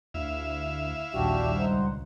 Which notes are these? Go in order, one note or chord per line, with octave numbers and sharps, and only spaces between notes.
D2 E4 E5 F5
A#1 D#2 G3 D4 F#4 G4
C#2 D#4 C5 F#5